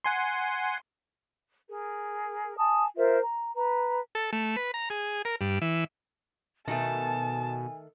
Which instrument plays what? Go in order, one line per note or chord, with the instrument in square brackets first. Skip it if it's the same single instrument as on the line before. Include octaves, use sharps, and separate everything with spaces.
[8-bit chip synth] F#5 G#5 C6
[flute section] G#4 A#4
G#5 A5 D#6
F4 A#4 C5 E5
A#5
B4 A#5
[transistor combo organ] A4
A3
B4
A#5
G#4
A#4
G2
E3
[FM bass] B2 [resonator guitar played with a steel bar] D#3 A3 [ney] G#5 [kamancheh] A5